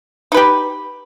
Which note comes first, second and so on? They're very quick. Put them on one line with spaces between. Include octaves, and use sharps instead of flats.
D#4 B4 G4